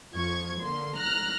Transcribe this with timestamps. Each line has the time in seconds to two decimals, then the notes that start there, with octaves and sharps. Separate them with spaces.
0.12 F2 F3 C#6 G#6
0.61 D3 A#3 C6
0.97 A#5 F6 F#6 A#6